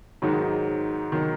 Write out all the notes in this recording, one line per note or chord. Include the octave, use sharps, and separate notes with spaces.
G#2 D#3 F#3
D#3 F#3